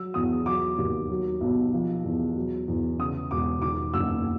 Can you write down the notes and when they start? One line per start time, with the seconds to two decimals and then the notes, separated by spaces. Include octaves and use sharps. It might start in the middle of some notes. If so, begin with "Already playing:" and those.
Already playing: F#3 E6
0.14 E2 D#6
0.46 F#3 D6
0.78 D#2
1.10 F#3
1.41 B1
1.73 F3
2.04 E2
2.35 F#3
2.68 E2
2.99 C#3 D#6
3.31 E1 D6
3.62 D#3 D6
3.93 F#1 E6